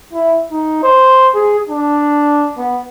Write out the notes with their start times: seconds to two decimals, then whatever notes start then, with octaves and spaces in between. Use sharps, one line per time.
0.13 E4
0.51 D#4
0.83 C5
1.35 G#4
1.69 D4
2.58 B3